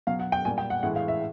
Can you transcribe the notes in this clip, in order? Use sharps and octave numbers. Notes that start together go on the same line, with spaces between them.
B2 F#3 F5
F#5
G5
A#2 G3 G#5
G5
F#5
A2 E3 G#3 F#5
F5
E5